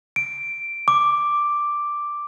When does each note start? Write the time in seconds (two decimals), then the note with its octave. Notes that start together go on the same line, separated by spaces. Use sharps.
0.16 D7
0.88 D6